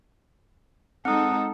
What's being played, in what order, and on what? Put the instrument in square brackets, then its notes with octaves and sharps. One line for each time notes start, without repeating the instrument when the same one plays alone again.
[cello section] G#3 D#4 A4 [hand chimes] C4 D#6 [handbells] F#5 F6